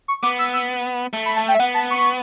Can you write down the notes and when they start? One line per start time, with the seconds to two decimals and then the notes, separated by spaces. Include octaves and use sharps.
0.08 C#6
0.22 B3 D6
0.39 E6
0.53 E6
1.13 A3
1.26 B5
1.36 A5
1.48 G5
1.55 E5
1.60 B3 F#5
1.74 A5
1.91 C#6